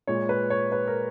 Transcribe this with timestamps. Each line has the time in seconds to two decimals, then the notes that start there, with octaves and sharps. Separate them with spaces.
0.07 A#2 G#3 C#5
0.29 B4
0.50 C#5
0.72 B4
0.88 A#4